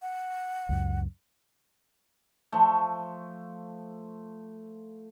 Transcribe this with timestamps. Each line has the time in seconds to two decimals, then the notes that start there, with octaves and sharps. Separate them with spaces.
0.02 F#5
0.69 C#2 F#2
2.52 F3 A3